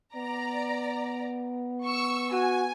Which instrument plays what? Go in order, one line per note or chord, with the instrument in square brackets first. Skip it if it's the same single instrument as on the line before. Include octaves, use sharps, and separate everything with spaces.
[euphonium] B3 [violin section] D5 A#5
[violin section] C#6 E6
[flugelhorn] F#4 [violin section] G#5